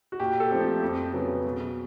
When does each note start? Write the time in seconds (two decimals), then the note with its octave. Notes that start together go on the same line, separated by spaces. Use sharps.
0.12 F#4
0.20 A#2 G4
0.40 A4
0.51 F3 A3 C4
0.82 F2
1.13 C#3 F#3 B3
1.45 B2